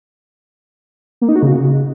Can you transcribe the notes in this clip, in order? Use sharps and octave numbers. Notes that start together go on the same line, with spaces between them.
A#3
D#4
F#4
C#3